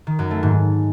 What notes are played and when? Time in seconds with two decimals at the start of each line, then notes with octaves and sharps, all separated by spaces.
0.07 D#3
0.19 F#2
0.31 A3
0.43 G#2